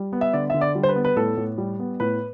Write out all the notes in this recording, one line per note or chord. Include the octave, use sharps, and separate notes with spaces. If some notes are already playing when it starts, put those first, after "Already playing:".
Already playing: G3
B3
E5
D3 D5
D3 E5
D5
G3
C5
B4
B3
B4
A2 A4
A2
G3
B3
A2 B4